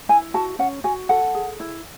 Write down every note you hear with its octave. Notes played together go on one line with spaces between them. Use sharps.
E4 G#5
F#4 A5
C#4 F#5
F#4 G#5
A4 F#5
G#4
E4